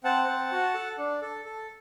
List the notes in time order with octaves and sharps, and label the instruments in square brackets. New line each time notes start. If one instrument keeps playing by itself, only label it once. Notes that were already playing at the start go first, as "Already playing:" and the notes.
[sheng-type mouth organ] C4 F#5 A5
C4
F#4
A4
D4
A4
A4